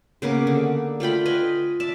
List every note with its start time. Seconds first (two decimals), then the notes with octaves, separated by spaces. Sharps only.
0.22 C#3 A#3 B3 D6
0.47 D3
1.00 A3 F4 G5 B5
1.26 B4 D#5 G#5
1.80 D5 E5 A5